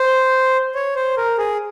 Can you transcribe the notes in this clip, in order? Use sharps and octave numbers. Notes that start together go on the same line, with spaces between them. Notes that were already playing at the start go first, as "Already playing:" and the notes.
Already playing: C5
C#5
C5
A#4
G#4